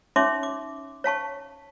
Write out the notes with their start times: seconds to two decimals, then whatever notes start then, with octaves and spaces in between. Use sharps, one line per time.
0.16 C#4 D#4 C#5 E5 C6 D6
0.43 D6
1.04 C#5 F5 A5 C#6